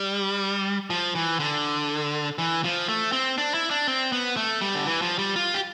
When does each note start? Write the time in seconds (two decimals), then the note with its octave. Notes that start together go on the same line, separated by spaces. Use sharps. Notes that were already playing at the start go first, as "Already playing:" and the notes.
Already playing: G3
0.90 F3
1.15 E3
1.40 D3
2.38 E3
2.64 F3
2.89 A3
3.12 C4
3.38 D4
3.54 E4
3.71 D4
3.88 C4
4.12 B3
4.36 A3
4.61 G3
4.75 D3
4.86 E3
5.02 F3
5.19 G3
5.36 F4
5.54 G4